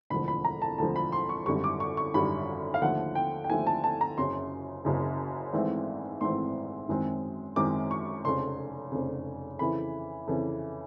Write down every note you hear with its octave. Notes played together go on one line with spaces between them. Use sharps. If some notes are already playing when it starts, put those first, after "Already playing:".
E1 D2 D3 F3 B5
B5
A#5
A5
E1 D2 D3 F3 A5
B5
C6
C#6
G#1 F#2 D3 G3 C#6
D6
C#6
C#6
G#1 F#2 D3 G3 B5
F5
D#2 D3 F3 A3 F#5
G5
G5
D#2 D3 F3 A3 G#5
A5
A5
A#5
F#1 F#2 C#3 C6
F#1 F#2 C#3
G#1 G#2 E3 A3 C4
G#1 G#2 E3 A3 C4 C6
F#2 D#3 G#3 C4
F#2 D#3 G#3 C4 D6
C#6
F1 F2 C#3 C6
F1 F2 C#3
F2 C#3 E3 B5
F2 C#3 E3